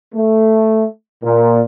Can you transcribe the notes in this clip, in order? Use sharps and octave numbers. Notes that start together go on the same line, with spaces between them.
A3
A#2